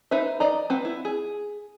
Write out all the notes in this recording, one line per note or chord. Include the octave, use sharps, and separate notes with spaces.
D#4 B4 C5 E5
D5 D#5 A#5
C4 B4 F#5
E4
G#4